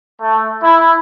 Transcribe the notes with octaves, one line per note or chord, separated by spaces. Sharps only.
A3
E4